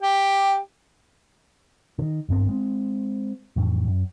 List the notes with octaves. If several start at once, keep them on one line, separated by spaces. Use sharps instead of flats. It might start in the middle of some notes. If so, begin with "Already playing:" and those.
G4
D3 D#3
G#1 G2 B3 C4
G#3 C4
F2 A2 E3
F#2